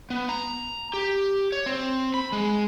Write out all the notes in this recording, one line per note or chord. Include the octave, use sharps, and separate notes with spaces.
B3
A#5
G4
C#5
C4
B5
G#3